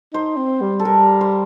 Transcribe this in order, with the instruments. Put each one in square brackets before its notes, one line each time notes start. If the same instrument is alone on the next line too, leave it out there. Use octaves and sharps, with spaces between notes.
[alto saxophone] D#4 [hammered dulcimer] C5
[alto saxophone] C4
G3
[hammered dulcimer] A4
[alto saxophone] G3 [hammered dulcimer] A#4
[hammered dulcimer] C5